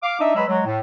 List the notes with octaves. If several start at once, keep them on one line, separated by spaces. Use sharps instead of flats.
F5 D6
D4 D#4 D#5 E5
F#3 G#3 B4 B5 E6
F#3 G#3
A2